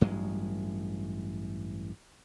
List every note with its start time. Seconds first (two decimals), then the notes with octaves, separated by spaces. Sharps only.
0.01 A1 G2 F#3 G#3